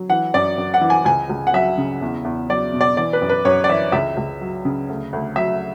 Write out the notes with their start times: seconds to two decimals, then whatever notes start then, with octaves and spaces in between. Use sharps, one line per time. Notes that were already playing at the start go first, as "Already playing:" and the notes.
Already playing: F#3
0.10 E3 F#5
0.34 F#2 D5
0.58 F#2
0.74 F#5
0.81 E3
0.90 G#5
1.05 C#2 G#5
1.30 C#2
1.47 F#5
1.53 F#3 E5
1.78 C#3
2.02 E2
2.25 E2
2.49 F#3 D5
2.74 B2
2.81 D5
2.97 E3 D5
3.13 B4
3.21 F#2
3.29 B4
3.45 F#2 C#5
3.64 D5
3.69 E3 E5
3.92 C#2 E5
4.17 C#2
4.41 F#3
4.65 C#3
4.89 D2
5.13 D2
5.36 F#3 E5